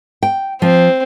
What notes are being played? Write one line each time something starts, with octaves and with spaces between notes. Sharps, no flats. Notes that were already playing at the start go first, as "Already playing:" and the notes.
G5
F3 C4